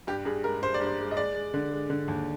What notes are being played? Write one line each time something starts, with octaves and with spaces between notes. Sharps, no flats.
G2 G4
G2 G#4
G#3 A#4
G2 C5
D5
G2
C5
G#3
D#5
G#3 D5
G#3
D3
G#3
D3
D#2